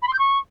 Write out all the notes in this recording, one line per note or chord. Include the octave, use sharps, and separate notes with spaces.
B5
C6
G6
C#6